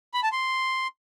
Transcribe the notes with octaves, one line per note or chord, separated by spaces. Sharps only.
B5
A5
C6